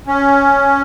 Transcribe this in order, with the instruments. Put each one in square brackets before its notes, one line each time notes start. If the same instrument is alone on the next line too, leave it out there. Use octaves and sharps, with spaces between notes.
[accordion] C#4